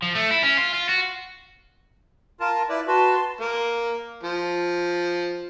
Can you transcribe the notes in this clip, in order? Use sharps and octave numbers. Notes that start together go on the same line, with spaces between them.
F3
A3
E4
C#4
F4
F4
F#4
F4 A#4 A5
E4 B4 D5
F#4 B4 A5 C6
A#3
F3